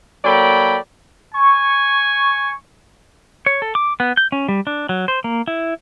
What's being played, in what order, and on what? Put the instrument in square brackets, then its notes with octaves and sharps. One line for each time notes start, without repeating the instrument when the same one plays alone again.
[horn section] F#3 A#3 A4 D5 G5 B5
[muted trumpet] G#5 [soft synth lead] C#6
[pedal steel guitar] C#5
A4
D6
B3
G6
C#4
G3
D4
F#3
C5
A#3
E4